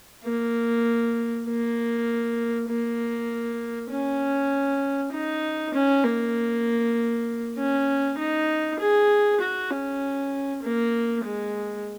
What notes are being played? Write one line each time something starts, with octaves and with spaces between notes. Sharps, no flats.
A#3
A#3
A#3
C#4
D#4
C#4
A#3
C#4
D#4
G#4
F#4
C#4
A#3
G#3